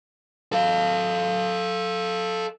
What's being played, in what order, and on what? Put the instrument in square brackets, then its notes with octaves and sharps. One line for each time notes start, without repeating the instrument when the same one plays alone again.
[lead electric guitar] A4 F5